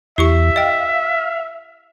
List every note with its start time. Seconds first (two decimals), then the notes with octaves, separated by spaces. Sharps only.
0.18 E2 E4 G4 E5 C#6
0.56 D#5 F5 G5